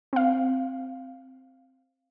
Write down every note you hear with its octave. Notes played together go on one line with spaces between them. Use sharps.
C4 F5